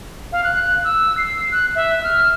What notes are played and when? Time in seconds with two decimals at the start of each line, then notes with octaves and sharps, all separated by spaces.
0.32 F5
0.44 F#6
0.84 E6
1.18 C7
1.51 F#6
1.75 E5
2.04 F6